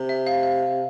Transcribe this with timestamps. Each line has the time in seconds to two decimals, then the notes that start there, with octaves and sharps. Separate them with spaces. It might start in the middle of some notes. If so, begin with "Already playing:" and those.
Already playing: C3
0.09 E5
0.27 F5
0.43 F5